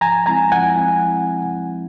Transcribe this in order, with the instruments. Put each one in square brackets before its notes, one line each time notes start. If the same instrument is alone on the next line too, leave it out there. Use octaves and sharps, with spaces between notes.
[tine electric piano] F3 [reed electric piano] G#5 A#5
[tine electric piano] G#3 C4 E4 [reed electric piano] G#5 A#5
[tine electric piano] F3 [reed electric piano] F#5 G#5
[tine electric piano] G#3 C4 E4